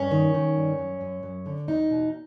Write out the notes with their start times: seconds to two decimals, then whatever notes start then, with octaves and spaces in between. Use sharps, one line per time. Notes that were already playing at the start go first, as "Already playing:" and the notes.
Already playing: G2 C#4
0.11 D#3
0.34 D#3
0.56 G2
0.79 F#2
1.01 F#2
1.23 F#2
1.46 D3
1.68 E2 D#4
1.90 B2